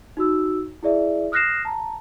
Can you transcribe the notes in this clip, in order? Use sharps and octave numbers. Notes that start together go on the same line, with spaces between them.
D#4 F#4 E6
E4 G#4 D5 E5
D#6 F6 F#6 A#6 C7 E7
A5 A#5